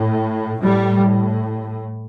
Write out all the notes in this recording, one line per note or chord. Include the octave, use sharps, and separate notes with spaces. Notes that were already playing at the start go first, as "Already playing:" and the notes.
Already playing: A2
A2 G3